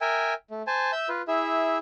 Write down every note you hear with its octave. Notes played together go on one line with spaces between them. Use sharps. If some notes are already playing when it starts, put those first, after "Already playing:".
A#4 E5 G5 G#5
A3
C5 G#5 A5
E5 E6 G6
F4 B4
E4 G#4 E5